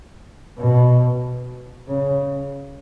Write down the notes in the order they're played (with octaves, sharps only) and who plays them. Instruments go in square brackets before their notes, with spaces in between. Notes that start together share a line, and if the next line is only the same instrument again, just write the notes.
[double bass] B2
C#3